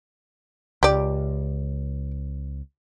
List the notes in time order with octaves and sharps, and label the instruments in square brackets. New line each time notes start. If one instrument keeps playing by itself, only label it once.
[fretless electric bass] C#2 [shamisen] G4 D5